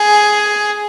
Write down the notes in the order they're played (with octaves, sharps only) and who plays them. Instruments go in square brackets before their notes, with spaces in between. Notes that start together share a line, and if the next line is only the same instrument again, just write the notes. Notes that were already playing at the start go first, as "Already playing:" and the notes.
Already playing: [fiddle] G#4